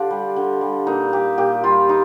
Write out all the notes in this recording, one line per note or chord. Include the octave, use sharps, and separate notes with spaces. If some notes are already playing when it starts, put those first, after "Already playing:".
Already playing: D3 D4 F4 G4
G3
D3
G3
A#2 D#4
G3 G4
A#2 G4
G3 F4
D#4